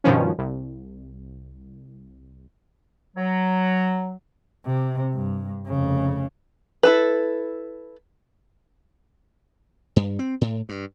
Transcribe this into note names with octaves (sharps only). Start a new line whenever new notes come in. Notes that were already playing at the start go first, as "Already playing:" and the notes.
G2 B2 D#3 F3 C#4
C2
F#3
C3
G2
F1 C#3
E4 A4 B4
G2
C4
A2
G2